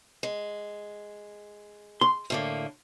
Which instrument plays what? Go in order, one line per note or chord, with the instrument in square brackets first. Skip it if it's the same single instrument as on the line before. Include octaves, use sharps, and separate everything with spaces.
[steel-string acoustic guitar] G#3
[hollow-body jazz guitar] C6
[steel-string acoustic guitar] A2 D3 A#3